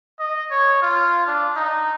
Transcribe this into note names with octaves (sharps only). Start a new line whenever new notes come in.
D#5
C#5
F4
D4
D#4